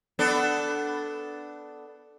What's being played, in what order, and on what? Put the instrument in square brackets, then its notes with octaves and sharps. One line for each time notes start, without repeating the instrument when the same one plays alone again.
[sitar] B3 D4 A4